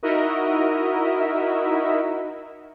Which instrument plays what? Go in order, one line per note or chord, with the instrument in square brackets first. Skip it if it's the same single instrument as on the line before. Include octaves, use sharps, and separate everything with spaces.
[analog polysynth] D#4 E4 F#4 A#4 D#5 E5